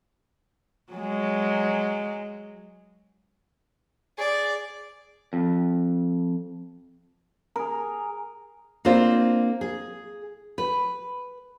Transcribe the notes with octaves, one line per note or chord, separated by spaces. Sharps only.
F#3 G#3
G#4 D5
F2
G#4 A#4
A#3 C4 D4 F4 C5
G#4
B4